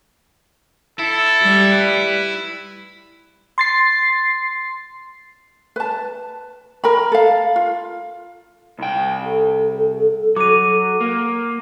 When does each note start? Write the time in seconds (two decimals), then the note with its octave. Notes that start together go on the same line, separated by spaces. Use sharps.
0.99 E4 A4
1.42 G3
1.72 B4
3.58 C6 A6 C7
5.76 B4 A5
6.84 A#4 A#5 B5
7.12 A4 F5
7.56 F4
8.79 C2 G5
9.24 A4
10.36 F#3 D6 D#7
11.00 A#3